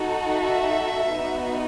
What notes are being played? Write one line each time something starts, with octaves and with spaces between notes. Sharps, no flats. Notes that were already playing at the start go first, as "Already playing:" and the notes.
Already playing: D#4 F#4 A4
E5
B3 D#4 F#4